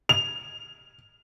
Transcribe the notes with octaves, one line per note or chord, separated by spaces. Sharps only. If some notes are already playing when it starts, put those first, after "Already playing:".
F7